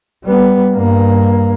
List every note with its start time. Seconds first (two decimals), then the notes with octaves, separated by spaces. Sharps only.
0.24 G3 B3
0.74 G2 A#3